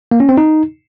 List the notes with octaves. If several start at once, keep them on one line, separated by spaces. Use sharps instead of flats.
A#3
C#4
C4
D#4